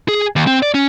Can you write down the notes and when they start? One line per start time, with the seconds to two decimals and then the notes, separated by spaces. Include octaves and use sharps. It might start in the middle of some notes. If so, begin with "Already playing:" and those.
0.08 G#4
0.36 D#2
0.47 C4
0.63 D5
0.74 C#4